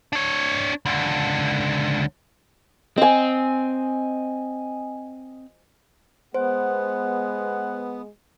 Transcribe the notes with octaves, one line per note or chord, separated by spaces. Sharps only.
D4 C#5
C#2 D3
C4 D#5 G#5
G#3 B3 C5 F#5